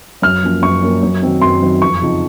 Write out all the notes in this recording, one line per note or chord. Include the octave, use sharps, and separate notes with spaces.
F#2 F6
F3 A#3 C#4
F#2 C#6
F3 A#3 C#4
F#2
D#3 F#3 C4 D#4
F#2 C6
D#3 F#3 C4 D#4
F2 C#6
C#3 F3 C4 D#4